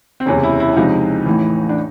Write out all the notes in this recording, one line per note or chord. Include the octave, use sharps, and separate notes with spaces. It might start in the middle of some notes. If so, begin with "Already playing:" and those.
C4
F#1 E2 C3 C#4
E4
E4
C#2 C3 F3 D#4
A1 A2 E3
D4